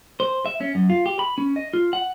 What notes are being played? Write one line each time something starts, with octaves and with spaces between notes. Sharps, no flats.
C5
E5
C#4
F#2
F4
G4
B5
C#4
D#5
F4
F#5